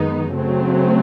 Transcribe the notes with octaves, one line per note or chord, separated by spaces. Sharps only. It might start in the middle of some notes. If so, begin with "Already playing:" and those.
Already playing: F#2 D#3 G#3 B3 D#4
C#3 F#3 A3 C4